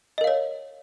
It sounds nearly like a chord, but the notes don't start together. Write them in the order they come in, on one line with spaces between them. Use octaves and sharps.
D#5 A#4 F5 C#5